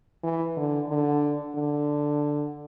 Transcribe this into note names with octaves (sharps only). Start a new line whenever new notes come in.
E3
D3
D3
D3